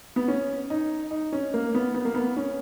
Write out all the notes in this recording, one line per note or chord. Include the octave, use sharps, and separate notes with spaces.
B3
C#4
D#4
D#4
C#4
A#3
B3
B3
A#3
B3
C#4